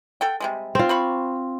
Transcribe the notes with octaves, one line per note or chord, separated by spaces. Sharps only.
A4 F#5 G5
C3 G3 G#3
C4 F4
C5 B5 C#6